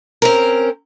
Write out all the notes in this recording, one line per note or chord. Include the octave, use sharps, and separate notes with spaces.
C4 C#4 A#4